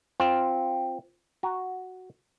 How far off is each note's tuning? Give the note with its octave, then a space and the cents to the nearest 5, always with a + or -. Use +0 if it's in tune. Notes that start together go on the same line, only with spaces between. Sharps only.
C4 +0 F4 +0
F#4 +0 A#5 +0